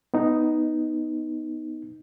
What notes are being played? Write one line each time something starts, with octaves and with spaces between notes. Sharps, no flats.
B3 D#4